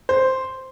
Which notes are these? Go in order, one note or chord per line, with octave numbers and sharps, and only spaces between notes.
C5